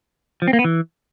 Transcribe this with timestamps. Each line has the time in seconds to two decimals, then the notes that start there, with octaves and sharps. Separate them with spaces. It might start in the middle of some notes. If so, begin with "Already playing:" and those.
0.42 F3
0.48 C4
0.53 A#3
0.59 B3
0.64 E3